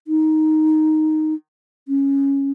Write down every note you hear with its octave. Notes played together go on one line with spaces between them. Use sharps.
D#4
C#4